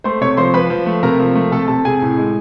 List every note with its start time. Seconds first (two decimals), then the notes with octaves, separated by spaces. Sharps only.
0.04 A3 C5 C6
0.21 C3 C#5 C#6
0.37 F3 C5 C6
0.54 F3 B4 B5
0.70 F3
0.86 A3
1.03 C3 A#4 A#5
1.19 F3
1.35 A3
1.52 C3 A4 A5
1.68 C3 A4 A5
1.85 C3 G#4 G#5
2.01 A2
2.18 G#3